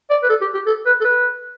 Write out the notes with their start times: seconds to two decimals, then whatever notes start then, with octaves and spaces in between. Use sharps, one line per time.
0.10 D5
0.23 B4
0.29 A4
0.41 G4
0.54 G4
0.66 A4
0.86 B4
1.01 A4
1.04 B4